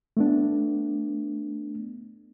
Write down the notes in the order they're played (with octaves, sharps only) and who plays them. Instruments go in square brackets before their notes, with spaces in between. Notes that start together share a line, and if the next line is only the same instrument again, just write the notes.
[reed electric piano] A3 B3 D4